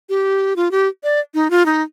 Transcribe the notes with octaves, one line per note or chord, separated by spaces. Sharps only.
G4
F4
G4
D5
D#4
F4
D#4